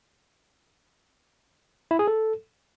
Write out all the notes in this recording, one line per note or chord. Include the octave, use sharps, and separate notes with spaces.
E4
G#4
A4